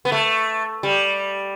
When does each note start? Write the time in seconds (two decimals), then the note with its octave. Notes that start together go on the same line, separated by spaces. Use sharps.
0.05 B3
0.12 A3
0.83 G3